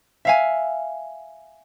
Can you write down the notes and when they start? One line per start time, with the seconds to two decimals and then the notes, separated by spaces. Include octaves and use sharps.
0.25 E5 F5 G#5